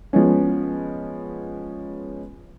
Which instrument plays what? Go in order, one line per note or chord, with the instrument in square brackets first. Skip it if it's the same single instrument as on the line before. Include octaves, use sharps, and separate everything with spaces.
[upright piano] F3 G#3 B3 C#4